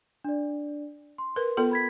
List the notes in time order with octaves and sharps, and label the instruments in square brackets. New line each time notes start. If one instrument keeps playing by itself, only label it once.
[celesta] D4 D5
C6
[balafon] A#4 B4
B3 F4 A4
[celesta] B5 G#6 B6